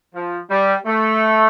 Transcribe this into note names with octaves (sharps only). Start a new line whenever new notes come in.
F3
G3
A3